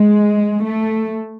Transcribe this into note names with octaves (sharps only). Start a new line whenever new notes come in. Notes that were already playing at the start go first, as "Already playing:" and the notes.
Already playing: G#3
A3